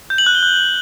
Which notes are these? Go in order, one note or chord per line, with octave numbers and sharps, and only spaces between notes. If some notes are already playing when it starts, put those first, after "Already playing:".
G6
F#7
F#6
G7
F#6